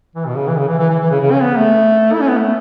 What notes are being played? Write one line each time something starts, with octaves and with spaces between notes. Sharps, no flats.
E3
B2
C#3
E3
C#3
E3
E3
E3
E3
C#3
C#3
C#4
B3
A3
E4
C#4
B3
A3